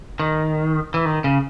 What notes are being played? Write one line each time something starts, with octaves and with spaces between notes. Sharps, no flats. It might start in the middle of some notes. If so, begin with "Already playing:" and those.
D#3
E3
D#3
C#3